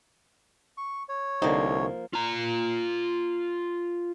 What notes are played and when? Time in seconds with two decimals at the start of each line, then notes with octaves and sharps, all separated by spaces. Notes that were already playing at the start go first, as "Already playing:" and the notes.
0.77 C#6
1.09 C#5
1.42 C2 D3 F3 A#3 D#4
2.14 F4 A#5